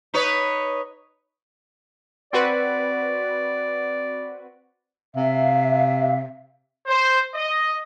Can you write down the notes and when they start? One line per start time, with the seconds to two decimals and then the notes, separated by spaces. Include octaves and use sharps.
0.14 D#4 B4 C#5
2.33 C4 F#4 B4 D5
5.16 C3 E5 F5
6.87 C5
7.34 D#5